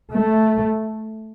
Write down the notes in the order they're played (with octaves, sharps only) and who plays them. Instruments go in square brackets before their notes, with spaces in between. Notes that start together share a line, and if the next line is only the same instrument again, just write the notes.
[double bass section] A3